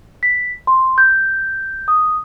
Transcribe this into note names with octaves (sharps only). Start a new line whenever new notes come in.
B6
C6
G6
D#6